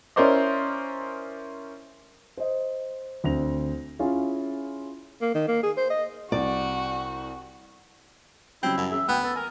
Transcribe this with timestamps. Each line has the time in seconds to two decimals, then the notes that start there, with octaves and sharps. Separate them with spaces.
0.16 C#4 E4 A#4 C5 D5 D#5
2.37 C5 D#5
3.24 D2 C4 A#6 F7
3.99 C#4 E4 F4 G#4
5.22 A#3
5.35 D#3
5.48 A#3
5.63 G#4
5.77 C5
5.90 D#5
6.32 C2 F#4 D5
8.63 C#3 F#3 G3 C4 E4
8.77 F#2
8.91 C#4 G#4 E5
9.08 D2 B3 G5
9.23 A4 B4
9.36 A#4 G#5